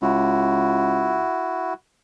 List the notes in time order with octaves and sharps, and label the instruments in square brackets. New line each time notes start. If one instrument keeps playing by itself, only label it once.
[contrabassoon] C#2 [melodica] E4 F#4